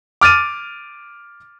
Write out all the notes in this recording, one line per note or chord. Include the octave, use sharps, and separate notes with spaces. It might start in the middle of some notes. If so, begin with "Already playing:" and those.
D6 F6 A6 D#7